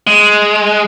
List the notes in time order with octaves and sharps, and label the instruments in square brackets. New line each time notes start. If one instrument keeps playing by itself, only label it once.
[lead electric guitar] G#3